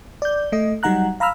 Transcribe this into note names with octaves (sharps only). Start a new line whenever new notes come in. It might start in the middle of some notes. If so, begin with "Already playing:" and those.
D5 G6
A3 D#5
F#3 G3 D#4 F#5 A#5 F#6
F5 A#5 B5 E6 F6